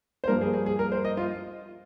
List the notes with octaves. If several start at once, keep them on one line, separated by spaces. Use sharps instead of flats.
C5
G2 F3 A#3 A#4
G#4
G#4
G#4
A#4
C5
D#5
F4